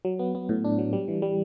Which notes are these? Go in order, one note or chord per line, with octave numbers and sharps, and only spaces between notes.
F#3
B3
B3
A2
D4
F#3
G3
E3
G3